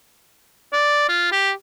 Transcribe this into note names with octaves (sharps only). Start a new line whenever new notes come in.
D5
F4
G4